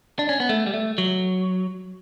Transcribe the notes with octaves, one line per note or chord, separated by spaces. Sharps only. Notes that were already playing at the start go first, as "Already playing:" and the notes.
D4
C#4
B3
A3
G3
A3
F#3